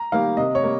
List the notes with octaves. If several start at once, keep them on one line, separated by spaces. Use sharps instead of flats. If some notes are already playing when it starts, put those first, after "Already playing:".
Already playing: A#5
D#3 G3 A#3 F5
C3 D#5
C#5
G3 A#3